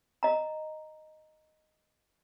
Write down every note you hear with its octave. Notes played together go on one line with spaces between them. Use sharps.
D#5 A#5